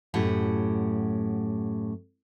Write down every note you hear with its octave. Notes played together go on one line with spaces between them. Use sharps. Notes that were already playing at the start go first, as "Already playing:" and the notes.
F#2 A2 G4 F#5